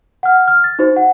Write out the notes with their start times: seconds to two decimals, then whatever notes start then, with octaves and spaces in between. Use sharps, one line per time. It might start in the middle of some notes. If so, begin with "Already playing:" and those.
0.23 F#5 F6
0.48 F6
0.64 A6
0.79 D#4 F#4 C5
0.96 F#5